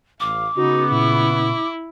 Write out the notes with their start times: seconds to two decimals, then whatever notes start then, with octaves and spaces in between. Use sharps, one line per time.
0.20 A1 F5 D6
0.57 C#3 B3 D#4 F#4
0.91 A#2 E4